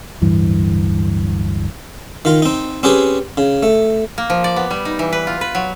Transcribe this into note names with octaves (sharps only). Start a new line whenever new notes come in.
D1 G2 E3
D#3 F4
C4 D#4
C4 C#4 G4 G#4 B4
C#3
A3
A#3
F3
D5
B3
G3
D#4
E3
B4
F4
B4
F#3